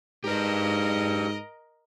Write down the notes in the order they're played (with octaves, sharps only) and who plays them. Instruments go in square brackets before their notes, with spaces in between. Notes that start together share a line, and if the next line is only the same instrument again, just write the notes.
[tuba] G#2 [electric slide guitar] G4 B4 [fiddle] A#4 D#5